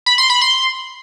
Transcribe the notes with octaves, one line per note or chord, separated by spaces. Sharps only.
B5
C6
B5
C6